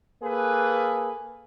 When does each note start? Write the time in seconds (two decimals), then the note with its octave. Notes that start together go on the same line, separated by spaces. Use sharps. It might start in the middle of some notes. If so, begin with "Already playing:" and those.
0.22 A#3 G#4 A4 B4